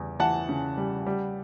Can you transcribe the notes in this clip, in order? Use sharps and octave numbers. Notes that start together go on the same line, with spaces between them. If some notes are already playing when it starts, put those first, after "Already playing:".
Already playing: E2 C#3 G3
E3 F#5 A5
C#3
G3
G3